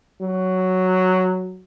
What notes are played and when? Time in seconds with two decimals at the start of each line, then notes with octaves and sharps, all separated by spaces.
0.21 F#3